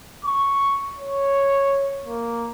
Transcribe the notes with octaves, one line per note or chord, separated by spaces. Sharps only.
C#6
C#5
A#3